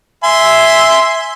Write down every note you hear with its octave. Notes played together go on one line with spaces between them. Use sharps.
E5 G#5 C6